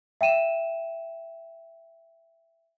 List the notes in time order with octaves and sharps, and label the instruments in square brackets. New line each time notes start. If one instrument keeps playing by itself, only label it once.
[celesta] E5 G5 D#7 E7